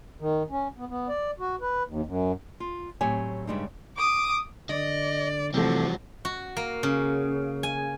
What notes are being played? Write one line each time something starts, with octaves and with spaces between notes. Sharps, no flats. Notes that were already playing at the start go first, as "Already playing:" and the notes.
D#3
C#4
B3
B3
D5
F#4
B4
D#2
F#2
F4
A2 F#3 C4 G4 C#5 G#5
G2 C#3 G3 G#3 D4 D#4
D6 D#6
D3 D5 D#5
C3 E3 F3 G3 A3 F#4
F#4
A#3
C#3
G#5